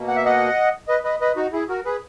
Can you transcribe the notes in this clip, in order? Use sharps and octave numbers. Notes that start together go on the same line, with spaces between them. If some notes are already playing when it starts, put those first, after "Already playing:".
Already playing: B2 A#3
F#5
E5
D#5 F#5
B4 D#5
B4 D#5
B4 D#5
D#4 F#4
E4 G#4
F#4 A#4
G#4 B4